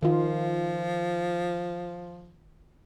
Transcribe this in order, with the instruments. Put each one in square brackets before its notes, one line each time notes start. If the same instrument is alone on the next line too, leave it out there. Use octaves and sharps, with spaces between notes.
[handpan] D#3 F4 [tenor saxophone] F3